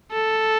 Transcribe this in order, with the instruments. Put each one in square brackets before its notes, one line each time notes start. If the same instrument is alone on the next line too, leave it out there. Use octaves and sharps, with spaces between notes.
[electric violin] A4